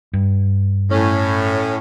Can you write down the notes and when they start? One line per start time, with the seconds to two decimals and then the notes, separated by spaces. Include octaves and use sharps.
0.13 G2
0.90 A2 C#4